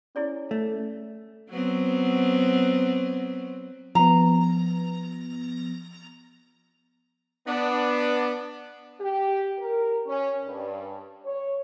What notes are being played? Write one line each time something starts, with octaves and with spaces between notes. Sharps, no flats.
C#4 E4 G#4 D5
A3
F#3 B3 C4
F3 B3 A#5
B3 D4
G4
A#4
C#4
G2
C#5